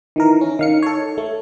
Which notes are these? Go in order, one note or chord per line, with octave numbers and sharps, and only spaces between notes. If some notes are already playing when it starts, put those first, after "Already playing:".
D#3 E3 A#4
C#4
D#3 F5 C#7
A4 C#5
A3